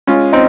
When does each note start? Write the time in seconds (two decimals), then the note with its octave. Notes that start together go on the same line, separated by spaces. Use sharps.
0.07 G#3 C#4 F4
0.33 C4 D#4